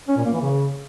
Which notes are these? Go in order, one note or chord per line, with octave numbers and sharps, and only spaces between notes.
C#4
A#2
A#3
E3
C#3